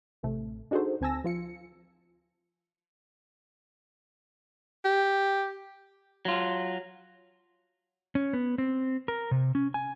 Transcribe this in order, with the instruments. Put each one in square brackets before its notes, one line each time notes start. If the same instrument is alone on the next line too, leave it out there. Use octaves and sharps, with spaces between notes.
[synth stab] A1 A2 C3 A3
D4 D#4 F#4 G#4 A4 C5
D2 C4 G#5 A5 E6 A#6
F3 F4 C#7
[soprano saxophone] G4
[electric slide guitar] F#3 F4
C#4
B3
C4
A#4
C3
C#4
G#5